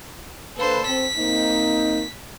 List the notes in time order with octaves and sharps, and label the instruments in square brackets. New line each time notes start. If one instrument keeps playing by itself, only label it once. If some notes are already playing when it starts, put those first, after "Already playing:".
[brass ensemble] D3 A#3 B4 [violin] A4 C5
[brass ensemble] C4 [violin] B6
[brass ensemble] A#3 C4 D#4